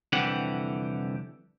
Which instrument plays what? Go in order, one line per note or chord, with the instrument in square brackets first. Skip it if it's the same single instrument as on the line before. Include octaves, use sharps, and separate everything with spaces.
[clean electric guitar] C2 F2 D3 E3 G4 F#5